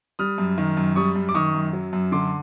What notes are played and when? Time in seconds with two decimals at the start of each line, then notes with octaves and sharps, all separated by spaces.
0.19 G3 D#6 F6
0.38 F#2
0.58 D#3
0.77 F#2
0.96 G3 C#6 D#6
1.16 F#2
1.29 D6
1.35 D#3 C#6 D#6
1.54 F#2
1.73 F#3
1.93 F#2
2.12 D3 C6 D6